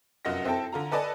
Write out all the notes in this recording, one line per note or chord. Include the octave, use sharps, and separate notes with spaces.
F1 F#2 F4 D#5 F#5 A#6
C4 E4 A4 G5 A5
D3 F4 A#5
A4 B4 D5 D#5 G#5 A5